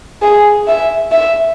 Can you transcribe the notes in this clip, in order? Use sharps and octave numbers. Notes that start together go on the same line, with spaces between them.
G#4
E5
E5